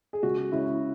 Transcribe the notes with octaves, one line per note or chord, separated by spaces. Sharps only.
G#4
C#2 F#4
C#3 G#3 E4